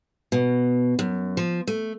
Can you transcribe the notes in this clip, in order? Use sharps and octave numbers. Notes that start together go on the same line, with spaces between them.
B2
F#2
F3
A3